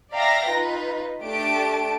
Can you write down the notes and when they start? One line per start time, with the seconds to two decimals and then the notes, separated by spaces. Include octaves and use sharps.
0.14 D5 E5 F5 G5 A#5 A#6
0.50 D#4 F4 B4
1.21 A3 D4 G4 A5 D7